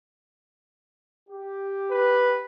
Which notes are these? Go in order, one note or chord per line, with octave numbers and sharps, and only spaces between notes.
G4
B4